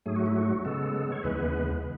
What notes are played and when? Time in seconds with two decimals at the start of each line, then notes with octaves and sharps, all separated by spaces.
0.06 G#2 F#3 A3 G#4
0.16 F#4
0.26 E4
0.36 F#4
0.64 C#3 G#3 B3 A4
1.12 C#5
1.23 D#2 C#3 E3 G#3 B3 B4